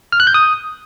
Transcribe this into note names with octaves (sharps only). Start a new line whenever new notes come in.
F6
F#6
G6
D#6